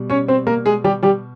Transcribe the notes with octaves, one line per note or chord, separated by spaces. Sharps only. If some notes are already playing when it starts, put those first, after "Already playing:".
Already playing: B2 G3
C#4 C#5
C4 C5
A#3 A#4
G#3 G#4
G3 G4
G3 G4